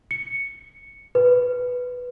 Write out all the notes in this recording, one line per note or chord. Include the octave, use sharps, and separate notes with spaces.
C#7
B4